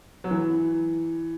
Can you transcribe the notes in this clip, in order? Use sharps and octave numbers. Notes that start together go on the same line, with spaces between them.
F#3
E3